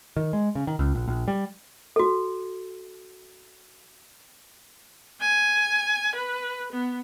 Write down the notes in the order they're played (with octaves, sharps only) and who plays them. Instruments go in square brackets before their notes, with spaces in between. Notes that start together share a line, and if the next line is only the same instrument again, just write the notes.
[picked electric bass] D#3
G#3
C#3
D#3
C#2
A#1
A#1
G3
[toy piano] F#4 A4
[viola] G#5
B4
B3